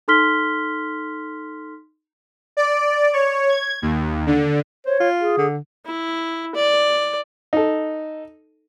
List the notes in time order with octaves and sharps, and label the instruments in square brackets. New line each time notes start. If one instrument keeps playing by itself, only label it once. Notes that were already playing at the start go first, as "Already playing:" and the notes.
[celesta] D#4 A4 C6 F6 B6 G7
[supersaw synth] D5
C#5
G#6
D#2
D3
[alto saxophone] C5 [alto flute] C#5
[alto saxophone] F4
[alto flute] G#4
[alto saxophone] D3
[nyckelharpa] E4
D5
[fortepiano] D#4 A4